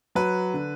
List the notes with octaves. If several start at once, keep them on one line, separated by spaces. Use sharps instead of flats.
F#3 B4
D3